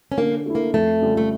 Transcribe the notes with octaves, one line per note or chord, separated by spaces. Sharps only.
C#4
D3 A#3
A3 E4
A#3
F2 A3
C#3 G3 C#4 F4
A3